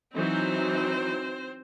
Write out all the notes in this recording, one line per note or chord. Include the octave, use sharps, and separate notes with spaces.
E3 F#3 C4 D#4 C5